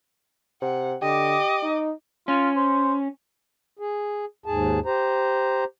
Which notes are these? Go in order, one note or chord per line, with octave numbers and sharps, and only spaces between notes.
C3 F#5
D3 G4 D#5 D6
D#4
C#4 F4
C5
G#4
D#2 G#2 G#4 A5
G4 C5 A#5